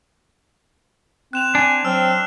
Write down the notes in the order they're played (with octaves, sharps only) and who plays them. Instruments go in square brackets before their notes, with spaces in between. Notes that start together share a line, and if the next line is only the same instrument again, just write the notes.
[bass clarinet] C4 [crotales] F#6 E7 F7
[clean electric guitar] D4 [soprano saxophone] G#5
[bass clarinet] F#3 [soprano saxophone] C4 [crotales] E6 F6